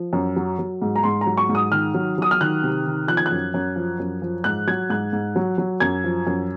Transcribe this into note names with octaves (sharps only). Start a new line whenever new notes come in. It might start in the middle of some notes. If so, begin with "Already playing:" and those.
Already playing: F3
F#2
F#3
F#3
G#2
A#5
G#2 C6
A#5
F#3
C#6
G#2
D#6
D#3 F6
F#3
F#3 D#6
F6
D#3 F#6
C3
D#3
F3 F#6
G#6
F#6
F#2
F#2
F3
F#2
F3
G#2 F#6
F#3 G#6
G#2 F#6
G#2
F#3
F#3
F#2 G#6
F3
F#2